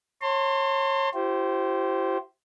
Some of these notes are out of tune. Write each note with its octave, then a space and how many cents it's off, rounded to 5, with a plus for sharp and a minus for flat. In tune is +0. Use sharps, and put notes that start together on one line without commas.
C#5 -30 A5 +45 C6 +0
E4 +40 G4 -30 C5 +0